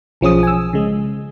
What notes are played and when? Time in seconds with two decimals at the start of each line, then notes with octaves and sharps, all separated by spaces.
0.21 B1 F3 C#4 G#4 D#6
0.43 G#5 E6
0.73 C#3 G#3